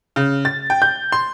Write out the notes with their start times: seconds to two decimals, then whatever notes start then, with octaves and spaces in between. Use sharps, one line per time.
0.16 C#3
0.45 A6
0.70 G5
0.82 G6
1.12 C6